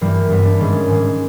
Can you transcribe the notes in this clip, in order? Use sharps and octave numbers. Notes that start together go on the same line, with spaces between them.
G2 E3 G3 A#3
G2 E3 G3 B3
D4
G#2 D#3 G#3 C#4
G#2 D#3 G#3